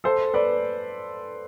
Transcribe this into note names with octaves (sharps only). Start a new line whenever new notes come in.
A4 C5
B4 D5